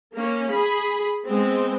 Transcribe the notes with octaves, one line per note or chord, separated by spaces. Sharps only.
A#3 C#4
G#4 B5
G#3 B3 C4